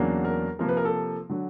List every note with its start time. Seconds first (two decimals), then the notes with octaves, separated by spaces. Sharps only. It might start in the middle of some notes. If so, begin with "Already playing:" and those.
Already playing: E2 C#3 F#3 A#3 D4
0.25 A#4
0.59 C3 F3 A#3 A#4
0.69 B4
0.77 A#4
0.85 A4
1.29 D3 F#3